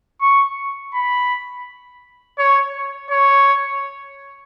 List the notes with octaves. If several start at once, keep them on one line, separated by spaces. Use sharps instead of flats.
C#6
B5
C#5
C#5